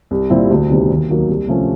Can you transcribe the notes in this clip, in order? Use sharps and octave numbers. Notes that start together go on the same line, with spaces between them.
C2
A#2 G3 C4 E4
D2
C3 D#3 G3 B3
D#2
D#3 F#3 A#3
C2
C3 F3 A3 C#4